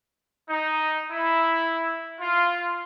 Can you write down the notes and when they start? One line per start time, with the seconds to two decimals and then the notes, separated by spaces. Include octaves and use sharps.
0.49 D#4
1.11 E4
2.21 F4